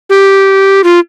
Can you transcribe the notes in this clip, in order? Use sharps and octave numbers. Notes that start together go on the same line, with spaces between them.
G4
F4